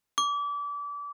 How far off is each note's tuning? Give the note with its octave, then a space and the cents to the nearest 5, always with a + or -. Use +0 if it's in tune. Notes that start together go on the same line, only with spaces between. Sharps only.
D6 -30